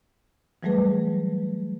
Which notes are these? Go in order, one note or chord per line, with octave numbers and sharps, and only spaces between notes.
E3 F#3 G3 A3 G#4 B4